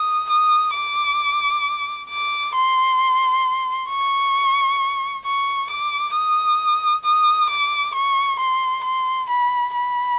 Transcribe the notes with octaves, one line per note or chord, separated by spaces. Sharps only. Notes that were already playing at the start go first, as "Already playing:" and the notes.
Already playing: D#6
D#6
D6
D6
C6
C#6
C#6
D6
D#6
D#6
D6
C#6
C6
C6
B5
B5